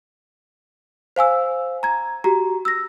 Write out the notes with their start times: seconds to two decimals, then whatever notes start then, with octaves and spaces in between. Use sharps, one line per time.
1.16 C5 F5 G#5 E6
1.83 A#5 G#6
2.24 F#4 G4 A#5
2.65 E6 A#6